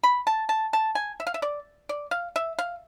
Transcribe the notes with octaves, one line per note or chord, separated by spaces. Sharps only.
B5
A5
A5
A5
G#5
E5
F5
E5
D5
D5
F5
E5
F5